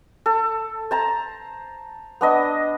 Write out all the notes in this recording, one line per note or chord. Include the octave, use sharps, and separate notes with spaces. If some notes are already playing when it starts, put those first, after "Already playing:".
A4
C5 A5 A#5
B3 D4 D#5